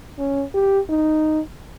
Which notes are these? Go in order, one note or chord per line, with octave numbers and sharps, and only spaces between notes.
C#4
G4
D#4